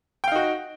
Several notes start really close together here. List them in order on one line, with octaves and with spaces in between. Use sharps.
G5 F5 D#4 F#4